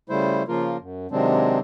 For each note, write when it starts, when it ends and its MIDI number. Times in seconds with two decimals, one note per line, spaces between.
0.09 0.43 49
0.09 0.43 55
0.09 0.43 57
0.09 0.43 64
0.09 0.43 72
0.48 0.77 49
0.48 0.77 53
0.48 0.77 58
0.48 0.77 65
0.48 0.77 70
0.80 1.07 42
1.11 1.59 48
1.11 1.59 51
1.11 1.59 54
1.11 1.59 56
1.11 1.59 60
1.11 1.59 62